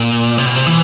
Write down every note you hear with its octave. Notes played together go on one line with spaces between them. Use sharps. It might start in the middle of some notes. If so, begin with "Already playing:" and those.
Already playing: A#2
C3
B2
C3
E3